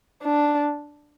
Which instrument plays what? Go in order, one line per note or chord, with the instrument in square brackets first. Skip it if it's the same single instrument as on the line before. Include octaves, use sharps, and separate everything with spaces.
[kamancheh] D4